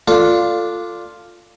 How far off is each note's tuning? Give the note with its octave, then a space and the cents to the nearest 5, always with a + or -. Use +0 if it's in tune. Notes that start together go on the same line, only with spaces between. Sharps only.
D4 +0 F4 +0 A4 +15